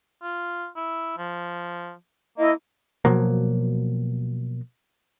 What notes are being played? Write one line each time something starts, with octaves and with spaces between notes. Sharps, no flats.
F4
E4
F3
A#3 E4 D#5
B2 F3 F#3 A#3